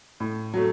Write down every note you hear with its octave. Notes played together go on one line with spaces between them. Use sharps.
A2
F#3 A3